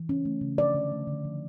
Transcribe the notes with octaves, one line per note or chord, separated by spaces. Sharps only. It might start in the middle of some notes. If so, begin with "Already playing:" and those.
Already playing: E3
C#4
A3
C#3
F3 D5
D3
A3
D3
F3